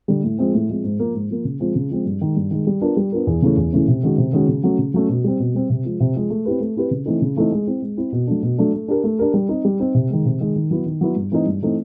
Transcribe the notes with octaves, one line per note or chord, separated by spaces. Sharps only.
D3 G3
A2
F3 G#3 C4
A2
F3 G#3 C4
G#2
F3 A#3
G#2
F3 A#3
C#3
F3 G#3 C4
C#3
F3 G#3 C4
G2
D#3 G#3
G2
D#3 G#3
G3
B3 D4 F4 A#4
G3
B3 D4 F4 A#4
E2
C#3 E3 A3 C#4
E2
C#3 E3 A3 C#4
C3
D#3 G#3 C#4 F#4
C3
D#3 G#3 C#4 F#4
C#3
F#3 A3 C#4
C#3
F#3 A3 C#4
B2
G3 C4
B2
G3 C4
C3
F3 G#3
C3
F3 G#3
A3
C4 E4 G4 B4
A3
C4 E4 G4 B4
C#3
E3 A3 C4 D#4
C#3
E3 A3 C4 D#4
G#3
C4 E4
G#3
C4 E4
B2
F#3 A3 D4
B2
F#3 A3 D4
A3
D4 G4 A#4
A3
D4 G4 A#4
G3
C4 D#4
G3
C4 D#4
C3
D#3 G#3
C3
D#3 G#3
D#3
F#3 B3 E4
D#3
F#3 B3 E4
G2
E3 A3 C4 D#4
G2
E3 A3 C4 D#4